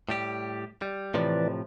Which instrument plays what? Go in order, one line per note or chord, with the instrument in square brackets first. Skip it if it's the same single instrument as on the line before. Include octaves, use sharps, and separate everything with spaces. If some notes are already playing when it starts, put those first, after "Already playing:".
[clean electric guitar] A2 G3 G4
G3
[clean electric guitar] A2 C3 F3 [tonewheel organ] E3 B4 D5